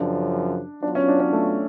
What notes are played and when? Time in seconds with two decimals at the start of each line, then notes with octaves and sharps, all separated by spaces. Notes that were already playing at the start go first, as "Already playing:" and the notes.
Already playing: F#2 C#3 F3 D4
0.82 F#3 B3 D4 F4
0.95 C#4
1.08 D4
1.20 C#4
1.33 A3